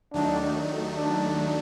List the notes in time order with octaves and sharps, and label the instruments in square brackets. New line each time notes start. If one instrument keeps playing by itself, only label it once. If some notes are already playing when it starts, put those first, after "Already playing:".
[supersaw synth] D#2 D#3 F#3 A3 D#4 [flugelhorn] D4
[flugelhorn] D4